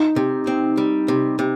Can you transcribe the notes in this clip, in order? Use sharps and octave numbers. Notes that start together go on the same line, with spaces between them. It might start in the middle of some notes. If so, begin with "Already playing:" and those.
Already playing: D#4
C3
C4
G3
C3
C3